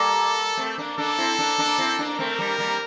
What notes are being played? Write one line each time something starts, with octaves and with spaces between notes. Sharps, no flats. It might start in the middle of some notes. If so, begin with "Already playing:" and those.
Already playing: G3 A#3 A4
A3 C4
A#3 D4
A#3 D4 A4
C4 E4
A#3 D4
A#3 D4
C4 E4
A#3 D4
A3 C4 A#4
G3 A#3
G3 A#3